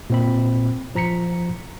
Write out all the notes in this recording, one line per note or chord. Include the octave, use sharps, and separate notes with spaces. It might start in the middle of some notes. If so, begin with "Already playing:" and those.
A#2 C4 B5
F3 A#5 B6 C#7